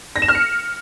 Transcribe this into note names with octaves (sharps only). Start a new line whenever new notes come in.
A#6
E7
F6
C#7